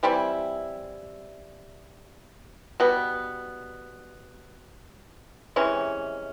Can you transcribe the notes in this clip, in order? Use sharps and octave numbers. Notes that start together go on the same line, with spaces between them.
E3 G3 C4 E4
B2 G3 B3
C3 E3 G#3 C#4